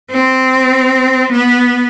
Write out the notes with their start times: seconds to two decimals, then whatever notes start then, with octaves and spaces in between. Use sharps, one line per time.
0.11 C4
1.32 B3